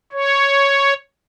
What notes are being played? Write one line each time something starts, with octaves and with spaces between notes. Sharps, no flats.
C#5